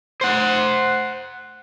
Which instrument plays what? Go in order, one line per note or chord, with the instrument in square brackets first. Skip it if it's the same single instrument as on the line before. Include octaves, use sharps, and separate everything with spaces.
[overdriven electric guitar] C5 F#5